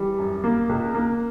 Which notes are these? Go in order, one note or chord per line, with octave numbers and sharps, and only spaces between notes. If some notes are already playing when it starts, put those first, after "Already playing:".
Already playing: E3 G3
F#2
A#3
C#2
A#3